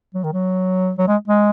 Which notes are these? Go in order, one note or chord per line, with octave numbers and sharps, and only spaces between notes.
F#3
D#3
F#3
F#3
G#3
G#3